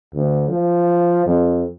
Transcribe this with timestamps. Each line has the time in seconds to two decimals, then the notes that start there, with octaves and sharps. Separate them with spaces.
0.13 D2
0.48 F3
1.26 F2